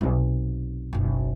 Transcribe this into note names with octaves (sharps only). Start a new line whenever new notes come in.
B1 C3
F#1 B1